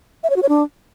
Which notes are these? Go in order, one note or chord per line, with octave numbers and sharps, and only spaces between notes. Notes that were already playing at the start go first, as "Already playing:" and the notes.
E5
C#5
F#4
C#5
D4